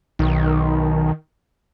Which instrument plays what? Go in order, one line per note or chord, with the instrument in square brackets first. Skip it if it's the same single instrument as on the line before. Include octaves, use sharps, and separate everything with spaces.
[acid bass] B1 [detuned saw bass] D#3